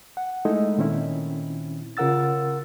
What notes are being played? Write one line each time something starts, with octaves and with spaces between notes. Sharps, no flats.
F#5
G#3 A3 D#4 E4 A4 D#5
A#2 D#3 C4 C#4 E4
C#3 F4 A#4 F#5 E6 A6